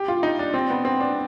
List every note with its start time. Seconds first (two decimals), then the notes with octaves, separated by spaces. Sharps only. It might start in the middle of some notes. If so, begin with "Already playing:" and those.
Already playing: G4
0.08 F4
0.23 D#4
0.39 D4
0.54 C4
0.70 B3
0.85 C4
1.01 D4